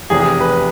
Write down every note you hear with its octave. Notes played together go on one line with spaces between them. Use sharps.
F1 E2 C3 E3 G#4
G#4
B4